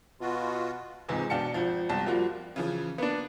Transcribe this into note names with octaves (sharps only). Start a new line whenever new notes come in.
B2 F4 F#4
C#2 G#2 C3 E3
B2 D4 F5 G5 A5 C#7
G#1 F3
G1 C2 G4 A5
F3 G3 A#3 F4 F#4
C#3 E3 F3
A#3 B3 D4